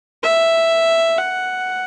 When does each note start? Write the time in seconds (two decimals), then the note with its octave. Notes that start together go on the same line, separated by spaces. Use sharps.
0.23 E5
1.18 F#5